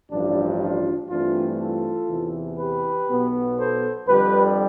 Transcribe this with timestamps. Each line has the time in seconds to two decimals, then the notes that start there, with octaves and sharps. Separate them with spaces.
0.11 A1 G2 F3 D4
0.60 D4 F4
1.10 G2 E3 A3 C4 D4 F4
1.59 F4 A4
2.10 E2 C3 E3
2.59 G4 B4
3.09 B1 B2 B3
3.58 A4 C5
4.08 F2 D3 G3 G4 B4